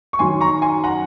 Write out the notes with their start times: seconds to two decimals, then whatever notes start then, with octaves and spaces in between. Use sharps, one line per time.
0.13 C#6
0.19 F#2 D#3 F#3 G#5 C6
0.41 A#5 C#6
0.62 G#5 C6
0.84 F#5 A#5